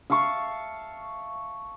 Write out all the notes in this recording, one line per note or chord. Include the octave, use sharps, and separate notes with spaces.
E5 F5 A5 C#6